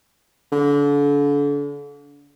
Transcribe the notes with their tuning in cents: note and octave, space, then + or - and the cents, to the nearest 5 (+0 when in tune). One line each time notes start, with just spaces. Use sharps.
D3 -35